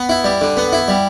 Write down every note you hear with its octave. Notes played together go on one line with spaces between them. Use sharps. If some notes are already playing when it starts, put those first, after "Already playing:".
Already playing: B3
E4
G3
D3
B3
E4
G3